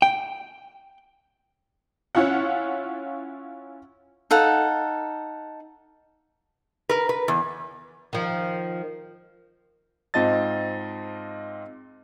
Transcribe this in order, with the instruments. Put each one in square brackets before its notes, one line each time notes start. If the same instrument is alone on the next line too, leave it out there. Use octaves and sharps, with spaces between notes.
[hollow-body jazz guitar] G5
[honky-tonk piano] C#4 E4 F4 F#5
[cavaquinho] D#4 A4 F5 F#5
[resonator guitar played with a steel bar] A#4 B4
B4
E2
[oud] D#3 F3
[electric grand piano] G#2 C4 F4 D#5 A5 A6